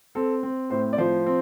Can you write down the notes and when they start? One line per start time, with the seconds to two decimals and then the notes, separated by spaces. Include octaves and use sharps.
0.15 C4 A4
0.43 C4
0.70 A2 C5
0.93 D5
0.98 F3 C5
1.26 C4